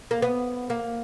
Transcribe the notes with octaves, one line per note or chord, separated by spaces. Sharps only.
A#3
B3
A#3